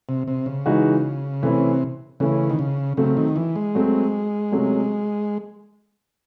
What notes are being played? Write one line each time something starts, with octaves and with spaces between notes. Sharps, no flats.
C3
C3
C#3
E3 G#3 D#4 F#4
C3 E3 A3 C#4 E4
C#3 E3 A3 C#4 E4
D#3
C#3
C#3 F#3 A3 C4
D#3
E3
G#3
F#3 A3 C4
C3 F#3 A3 C#4